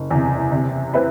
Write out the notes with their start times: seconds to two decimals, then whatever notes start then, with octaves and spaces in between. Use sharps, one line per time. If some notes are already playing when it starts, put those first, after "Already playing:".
Already playing: F#1
0.10 E2 C3
0.52 C3
0.94 C4 E4 B4